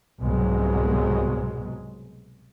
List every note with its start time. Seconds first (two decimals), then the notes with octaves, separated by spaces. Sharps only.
0.21 C2 G#2 B2 F#3 G#3